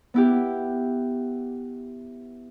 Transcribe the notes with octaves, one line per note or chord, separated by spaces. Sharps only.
B3 E4 G4